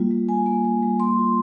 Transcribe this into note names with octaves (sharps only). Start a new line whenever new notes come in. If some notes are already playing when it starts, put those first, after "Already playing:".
Already playing: G3 A#3 F4
G3
G3 G#5
A#3
G3
G3
A#3 C6
F4